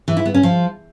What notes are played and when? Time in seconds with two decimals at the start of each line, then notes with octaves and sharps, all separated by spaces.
0.08 E3
0.17 E4
0.25 B3
0.34 C#4
0.43 F3